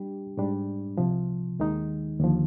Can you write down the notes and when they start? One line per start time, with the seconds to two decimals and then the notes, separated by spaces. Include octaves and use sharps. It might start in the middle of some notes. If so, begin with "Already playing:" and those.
Already playing: G3 D4 G4
0.37 G#2 G3 D4
0.97 C2 C3 F3
1.59 D#2 D#3 G#3 D#4
2.20 D#2 D3 F3